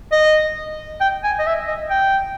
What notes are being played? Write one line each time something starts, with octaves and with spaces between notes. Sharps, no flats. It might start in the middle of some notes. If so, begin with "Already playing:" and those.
D#5
G5
G#5
D#5
E5
D#5
G5